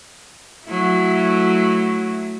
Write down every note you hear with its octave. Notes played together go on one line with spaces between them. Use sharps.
F#3 A3 E4